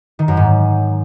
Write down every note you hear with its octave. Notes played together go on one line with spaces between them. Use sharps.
D#3
F#2
G#2